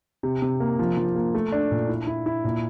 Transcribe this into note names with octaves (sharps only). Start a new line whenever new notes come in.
C3
C3
A#3
F3
F3
A#3
A3
D4
A#2
E4
E4
E4
A#2